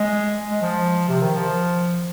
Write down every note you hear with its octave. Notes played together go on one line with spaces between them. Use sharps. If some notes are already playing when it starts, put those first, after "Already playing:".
Already playing: G#3
G#3
F3
C3
D#3
F3